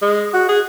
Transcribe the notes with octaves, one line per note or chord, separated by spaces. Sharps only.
G#3
F#4
G#4